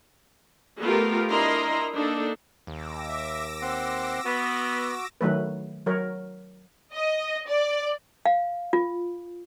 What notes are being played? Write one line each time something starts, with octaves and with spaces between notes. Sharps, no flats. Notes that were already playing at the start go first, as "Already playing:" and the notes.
A3 B3 F4 G4 A#4
D4 E4 A#4 D#5 A#5 C6
A#3 D4 D#4 A4
D#2 D6 E6 A#6
E5
C4 F#5 C6
B3 F#4
D#3 F#3 A3 B4
F#3 A#4 C#5
D#5
D5
F5
F4